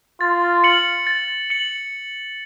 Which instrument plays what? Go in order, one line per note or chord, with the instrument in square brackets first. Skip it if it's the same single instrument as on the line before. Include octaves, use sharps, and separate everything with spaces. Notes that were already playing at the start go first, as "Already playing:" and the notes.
[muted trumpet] F4 [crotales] A6
[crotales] C#7 F#7
A6
C#7 F#7